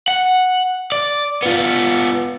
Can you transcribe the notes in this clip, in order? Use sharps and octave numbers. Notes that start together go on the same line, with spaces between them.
F#5
D5
B3 F4